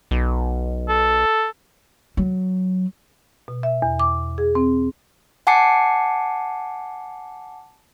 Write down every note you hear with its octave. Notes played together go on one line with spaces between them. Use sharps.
B1
A4
F#3
B2
E5
E2
D6
G#4
C4
F#5 G#5 A5 D6 C7 C#7